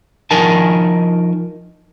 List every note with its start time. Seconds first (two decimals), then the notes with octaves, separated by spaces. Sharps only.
0.31 F3 D#4 A#4 G#5 A5